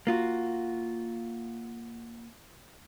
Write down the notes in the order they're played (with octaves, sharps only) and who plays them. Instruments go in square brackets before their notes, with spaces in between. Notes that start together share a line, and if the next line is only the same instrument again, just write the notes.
[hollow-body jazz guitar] A#3 F4 F#4